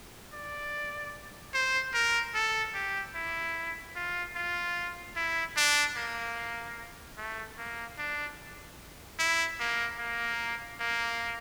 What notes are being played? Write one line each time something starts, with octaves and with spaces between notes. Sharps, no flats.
D5
C5
A#4
A4
G4
E4
F4
F4
E4
D4
A#3
A3
A#3
D4
E4
A#3
A#3
A#3